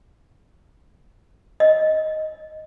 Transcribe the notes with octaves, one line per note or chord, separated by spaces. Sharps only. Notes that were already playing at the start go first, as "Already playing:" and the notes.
D#5